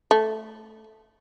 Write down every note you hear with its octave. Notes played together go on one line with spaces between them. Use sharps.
A3